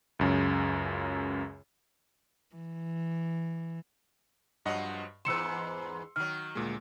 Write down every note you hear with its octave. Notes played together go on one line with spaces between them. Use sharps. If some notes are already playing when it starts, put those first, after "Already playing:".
C#2 F#2 C#3
E3
G2 F3 F#3 D#5 F#5
E2 G#2 B4 C6 E6 C#7 E7
D#3 F#3 F6
D2 A#2 G#3